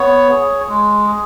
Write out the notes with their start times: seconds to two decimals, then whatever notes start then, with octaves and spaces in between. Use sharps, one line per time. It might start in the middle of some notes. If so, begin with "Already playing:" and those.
Already playing: B3 C#5
0.31 G#4
0.69 G#3
1.07 G#4